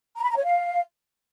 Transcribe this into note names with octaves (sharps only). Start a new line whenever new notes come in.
A#5
B5
A#5
C#5
F5